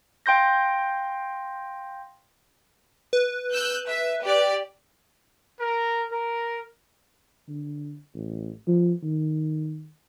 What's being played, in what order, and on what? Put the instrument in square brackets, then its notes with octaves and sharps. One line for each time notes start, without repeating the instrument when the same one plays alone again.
[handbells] F5 G5 C6 G6 A#6
[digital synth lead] B4
[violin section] E6 F#6 G6
E5
G4 D5
[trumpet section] A#4
A#4
[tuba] D3
A1
F3
D#3